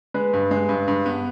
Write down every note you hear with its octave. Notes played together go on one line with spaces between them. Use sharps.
G#3 B4
G2
G#3
G2
G2
B3